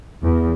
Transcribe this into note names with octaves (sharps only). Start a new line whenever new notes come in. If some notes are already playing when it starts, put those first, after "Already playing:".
E2